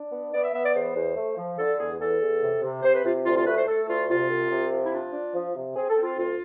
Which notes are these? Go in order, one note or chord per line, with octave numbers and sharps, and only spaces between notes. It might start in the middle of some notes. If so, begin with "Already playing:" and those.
Already playing: D4
B3
B3 D5
E5
B3 E5
D5
E2 C5
E2
A3
F3
D3 A4
E2 G#4
E2 A4
E2
C3
C3
C3 C5
B4
C3 F4
D2 F4
F4
A3 B4
C5
A3 A4
D2 F4
C3 F4
C2
C3
F3
E4
D4 F4
D4
F3
C3
C4 G#4
A4
C4
F4
D2 F4